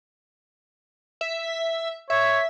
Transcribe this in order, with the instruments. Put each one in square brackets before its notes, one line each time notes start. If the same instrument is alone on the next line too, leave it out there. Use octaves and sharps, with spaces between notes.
[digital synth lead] E5
[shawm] C#5 [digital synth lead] E5